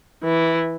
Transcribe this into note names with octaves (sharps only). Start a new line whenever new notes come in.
E3